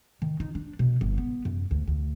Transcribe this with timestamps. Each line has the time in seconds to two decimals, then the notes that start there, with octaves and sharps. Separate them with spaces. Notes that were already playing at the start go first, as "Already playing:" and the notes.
0.22 D#3
0.40 D#4
0.55 D4
0.79 B2
1.01 G1
1.18 B3
1.45 F#2
1.71 D2
1.87 D2